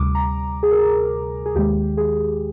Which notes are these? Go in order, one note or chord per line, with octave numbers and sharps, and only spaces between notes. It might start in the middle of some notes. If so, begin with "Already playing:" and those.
Already playing: D2 C3 G3 D6
A#5
G#4
A#4
G#4
D#2 D#3 G#3 G4
G#4